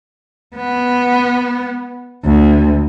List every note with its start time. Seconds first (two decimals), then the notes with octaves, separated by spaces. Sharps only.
0.56 B3
2.24 D2